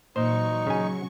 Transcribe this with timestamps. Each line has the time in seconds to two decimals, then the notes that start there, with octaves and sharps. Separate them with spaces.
0.16 A#2 E3 F#3 D#4 C5 C#6
0.67 C#3 G#5